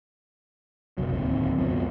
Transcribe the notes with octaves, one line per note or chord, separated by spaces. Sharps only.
F#1 C2 F#3
D1 D#2 C4
C#2 F#2 B2 F3